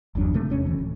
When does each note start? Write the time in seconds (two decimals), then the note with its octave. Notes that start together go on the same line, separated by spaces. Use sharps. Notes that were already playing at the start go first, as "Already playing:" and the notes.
0.15 G1 E2 F#3 D4
0.34 C3 A3
0.50 E1 C#4
0.66 D2 E3
0.78 D1